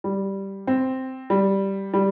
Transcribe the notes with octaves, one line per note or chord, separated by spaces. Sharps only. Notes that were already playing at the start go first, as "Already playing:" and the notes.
G3
C4
G3
G3